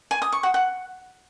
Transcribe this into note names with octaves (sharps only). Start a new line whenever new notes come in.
G#5
D#6
C#6
F#5
F#5